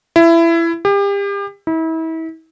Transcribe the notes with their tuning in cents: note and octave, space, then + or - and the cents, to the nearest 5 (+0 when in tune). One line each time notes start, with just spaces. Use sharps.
E4 +20
G4 +35
E4 -35